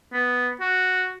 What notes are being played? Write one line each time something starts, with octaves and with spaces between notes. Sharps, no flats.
B3
F#4